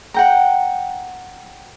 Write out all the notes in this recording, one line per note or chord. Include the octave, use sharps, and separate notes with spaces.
F#5 G5 A#5